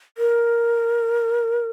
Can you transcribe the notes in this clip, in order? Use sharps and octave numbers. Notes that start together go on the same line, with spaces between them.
A#4